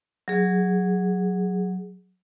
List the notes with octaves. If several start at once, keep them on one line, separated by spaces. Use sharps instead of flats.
F#3 G#4